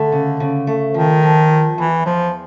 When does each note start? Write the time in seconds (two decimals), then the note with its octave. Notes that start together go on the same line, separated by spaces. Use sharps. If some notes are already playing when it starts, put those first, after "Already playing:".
Already playing: D3 A3
0.12 C#3
0.40 C#3
0.67 A3
0.94 D#3 F3
1.23 F3
1.49 E2
1.78 E2 E3
2.06 E2 F3